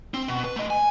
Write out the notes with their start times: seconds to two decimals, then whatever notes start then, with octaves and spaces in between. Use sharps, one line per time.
0.14 C4
0.28 B2
0.44 B4
0.56 A3 D#5
0.70 G#5